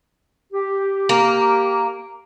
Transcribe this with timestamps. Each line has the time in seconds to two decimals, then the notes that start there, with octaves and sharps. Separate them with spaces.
0.53 G4
1.09 A#3